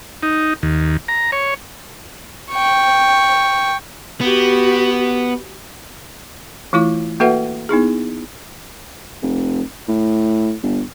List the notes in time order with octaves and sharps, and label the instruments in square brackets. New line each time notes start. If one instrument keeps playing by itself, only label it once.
[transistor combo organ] D#4
D#2
A#5
C#5
[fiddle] G5 C#6
[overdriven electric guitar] B3 [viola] F#4 G4
[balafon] E3 A3 E4 F4 D6
A#3 F#4 A4 B4 E5 F#5
B3 D#4 E4 G#4
[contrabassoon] F1
A2
G1